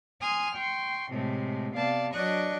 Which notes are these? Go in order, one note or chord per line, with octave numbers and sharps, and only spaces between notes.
G#5 C6 D#6 F6
G5 C6 C#6
A2 C3 G#3 A3
C3 B3 D5 F5 A5
F#3 D4 D5 D#5 C#6 F#6